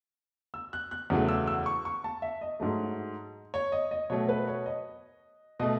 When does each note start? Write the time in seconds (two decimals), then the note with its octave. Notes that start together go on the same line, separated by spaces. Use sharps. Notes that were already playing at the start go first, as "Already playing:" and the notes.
0.54 E6
0.73 F#6
0.91 F#6
1.10 E2 C#3 F#3 A3
1.29 E6
1.47 E6
1.66 C#6
1.85 C#6
2.04 A5
2.22 E5
2.41 D#5
2.60 G#2 F#3 A3
3.54 C#5
3.72 D#5
3.91 D#5
4.10 B2 F#3 A3 C#5
4.29 B4
4.47 C#5
4.66 D#5
5.60 B2 A3 D#5